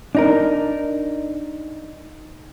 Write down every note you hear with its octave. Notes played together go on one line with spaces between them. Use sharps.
D4 D#4 A#4